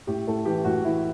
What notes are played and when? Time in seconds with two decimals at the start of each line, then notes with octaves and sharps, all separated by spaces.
0.07 A2 G4
0.27 A2 A4
0.45 E3 G4
0.64 A2 F#4
0.85 E3 E4